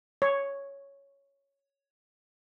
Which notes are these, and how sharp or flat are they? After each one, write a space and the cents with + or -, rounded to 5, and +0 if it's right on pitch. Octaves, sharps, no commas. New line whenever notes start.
C#5 +5